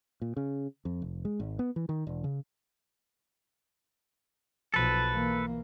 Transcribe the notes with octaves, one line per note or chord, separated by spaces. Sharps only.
A#2
C#3
F2
F1
G#3
G#1
B3
E3
D#3
E1
C#3
B1 F3 A4 B4
E3 A#3